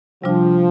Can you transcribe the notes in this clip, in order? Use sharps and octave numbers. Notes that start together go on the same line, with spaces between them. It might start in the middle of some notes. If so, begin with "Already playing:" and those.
C3 F3 G3 D4 F4